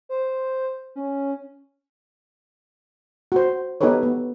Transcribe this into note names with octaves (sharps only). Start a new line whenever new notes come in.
C5
C#4
F#4 C5
B3 D#4 G4 A4 B4 C#5
B3